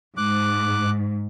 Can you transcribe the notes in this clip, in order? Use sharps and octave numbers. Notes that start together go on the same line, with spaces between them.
G#2 D6 F#6